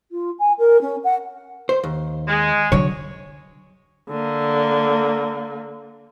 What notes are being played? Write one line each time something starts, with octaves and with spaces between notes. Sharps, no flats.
F4
G#5
A#4
C#4
F#5
C5
D#2
G#3
D3 F#3 C#5
D3 A#3